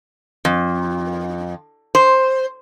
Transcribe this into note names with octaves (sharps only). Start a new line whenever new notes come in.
F2
C5